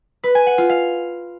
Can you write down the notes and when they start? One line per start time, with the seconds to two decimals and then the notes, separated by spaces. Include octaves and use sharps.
0.24 B4
0.35 G#5
0.47 F#5
0.58 F4
0.70 F5